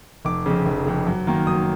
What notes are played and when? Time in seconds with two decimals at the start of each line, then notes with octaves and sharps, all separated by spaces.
0.25 F1 D6
0.46 F2 C#3
0.66 F1
0.86 F2 C#3
1.07 F#2
1.27 D#3 F#3 A#3
1.47 F#2 D#6